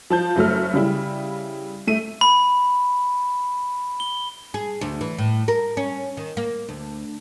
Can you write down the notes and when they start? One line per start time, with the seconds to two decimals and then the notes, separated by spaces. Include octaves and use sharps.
0.10 F3 A5 G6
0.36 F#1 F#3 A3 F6
0.74 C#3 G3 E4
1.87 A3 D#7
2.21 B5
4.00 G7
4.54 G#4
4.81 D2
5.01 E3
5.18 A2
5.48 A#4
5.77 C#4
6.17 D#3
6.37 A#3
6.69 D2